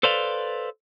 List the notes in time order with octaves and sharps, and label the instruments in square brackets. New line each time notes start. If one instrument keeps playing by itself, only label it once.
[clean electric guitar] A4 B4 C5 D5 F5